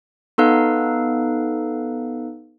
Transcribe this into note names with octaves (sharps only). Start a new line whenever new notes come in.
B3 D#4 A4 B4 F5